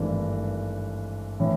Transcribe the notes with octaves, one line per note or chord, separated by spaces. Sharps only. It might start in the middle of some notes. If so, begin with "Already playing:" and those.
Already playing: G#1 G2 E3 A3 D4
A2 E3